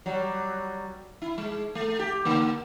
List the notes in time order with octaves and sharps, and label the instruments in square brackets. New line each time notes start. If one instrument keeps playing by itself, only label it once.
[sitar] F#3 G3
E4
G#3
A3
G4
D3 A#3